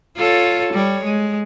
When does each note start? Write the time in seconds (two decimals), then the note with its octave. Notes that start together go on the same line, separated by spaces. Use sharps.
0.17 F4 A4 C#5
0.73 G3 C#5
1.04 G#3